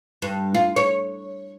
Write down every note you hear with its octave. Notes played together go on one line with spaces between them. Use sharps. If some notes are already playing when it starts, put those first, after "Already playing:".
G2
F4
C#5